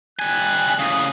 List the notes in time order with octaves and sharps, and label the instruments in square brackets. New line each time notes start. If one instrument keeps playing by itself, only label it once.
[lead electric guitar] G3 G#5 [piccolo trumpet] F#6
[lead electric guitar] A2 C#3 [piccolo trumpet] D#6